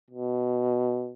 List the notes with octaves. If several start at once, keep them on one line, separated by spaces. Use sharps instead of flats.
B2